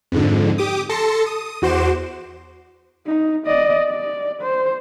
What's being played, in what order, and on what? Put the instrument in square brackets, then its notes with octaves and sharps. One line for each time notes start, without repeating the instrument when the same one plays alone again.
[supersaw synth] F2 G#2 D3
G4 D6 D#6
A4 A5 C6 A#6 C#7
D#6
E2 F#4 C5 C6 D6 E7
[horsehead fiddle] D#4
D5 D#5
D5
C5